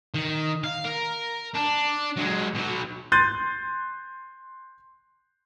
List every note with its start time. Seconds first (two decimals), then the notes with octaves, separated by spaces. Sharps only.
0.15 D#3
0.64 F5
0.85 A#4
1.54 D4
2.16 F#3 G#3
2.55 B2 F#3
3.12 C6 F#6 G6 A6 D#7